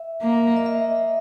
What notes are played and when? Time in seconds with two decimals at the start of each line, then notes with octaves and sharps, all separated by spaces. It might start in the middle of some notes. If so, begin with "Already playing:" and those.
Already playing: E5
0.22 A#3
0.57 D#5
0.66 E5